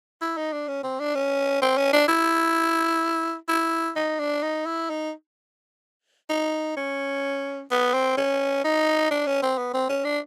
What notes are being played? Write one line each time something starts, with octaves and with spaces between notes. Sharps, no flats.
E4
D#4
D4
C#4
C4
D4
C#4
C4
C#4
D4
E4
E4
D#4
D4
D#4
E4
D#4
D#4
C#4
B3
C4
C#4
D#4
D4
C#4
C4
B3
C4
C#4
D4